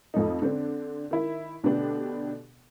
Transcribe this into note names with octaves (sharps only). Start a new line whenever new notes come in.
F2 F3 A3 D#4
D3 C4 D4
D#3 E4
B2 D3 A3 B3 D4 G4